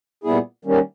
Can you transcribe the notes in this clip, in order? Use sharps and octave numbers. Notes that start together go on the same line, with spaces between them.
A#2 G3 B3 E4 G#4
D#3 G3 A#3 C#4